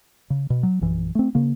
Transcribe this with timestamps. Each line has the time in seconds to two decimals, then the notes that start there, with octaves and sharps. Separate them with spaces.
0.30 C#3
0.50 B2
0.63 F#3
0.81 A#1 F#2 E3
1.15 A3 C4
1.35 C#3 A#3